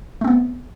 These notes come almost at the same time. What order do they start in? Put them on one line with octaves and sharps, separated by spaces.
A3 C4 B3